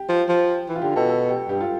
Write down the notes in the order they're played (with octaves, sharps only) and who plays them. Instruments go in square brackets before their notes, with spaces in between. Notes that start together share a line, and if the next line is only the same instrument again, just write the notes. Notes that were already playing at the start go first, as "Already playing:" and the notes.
Already playing: [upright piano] G4
[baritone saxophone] F3
F3
E3
[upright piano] F4
[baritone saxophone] D3 [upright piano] G4
[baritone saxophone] B2 [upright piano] A4
[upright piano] A4
G4
[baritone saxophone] G2 [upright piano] G4
[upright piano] F4